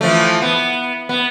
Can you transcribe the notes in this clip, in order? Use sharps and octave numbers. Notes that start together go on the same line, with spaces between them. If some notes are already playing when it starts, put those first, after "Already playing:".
E3 F3 A3
B3
B3